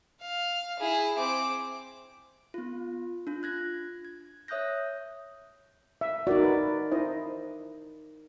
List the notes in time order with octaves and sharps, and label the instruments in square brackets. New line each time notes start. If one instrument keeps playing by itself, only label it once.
[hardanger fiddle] F5
E4 G#4
C4 D6
[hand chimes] B3 F4
D4 F4
F#6 G#6 A#6
G#6
C#5 E5 D#6 F#6 G6 A#6
[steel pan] E5
[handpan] D#4 A#4 D5 [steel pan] F#4
[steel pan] B4
E4 C5 D#5